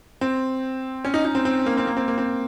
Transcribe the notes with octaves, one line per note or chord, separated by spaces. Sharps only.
C4
C#4
D#4
D#4
C4
C4
A#3
C4
A#3
C4
A#3
C4